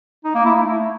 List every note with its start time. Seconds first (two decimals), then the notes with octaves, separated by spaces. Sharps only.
0.25 D#4
0.35 A#3
0.45 E4
0.55 A3